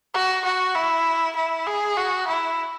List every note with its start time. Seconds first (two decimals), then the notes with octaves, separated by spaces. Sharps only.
0.14 F#4
0.45 F#4
0.75 E4
1.36 E4
1.67 G#4
1.97 F#4
2.27 E4